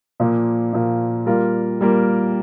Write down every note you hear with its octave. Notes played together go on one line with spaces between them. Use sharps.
A#2 F3 A#3
A#2 F3 A#3
G3 A#3 F4 A#4
G3 A#3 F4 A#4